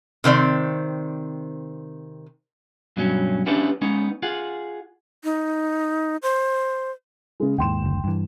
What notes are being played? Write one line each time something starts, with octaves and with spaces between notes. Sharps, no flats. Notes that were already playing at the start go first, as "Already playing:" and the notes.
C3 D#3 C4 D5
G2 B2 F#3 C#4
B3 C#4 D4 E4 G4 B4
G#3 B3 C#4 D#4
F4 G#4 F#5
D#4
C5
C#3 G#3
D#2 G#2 G5 C6 E7
F#1 D2
G2 E3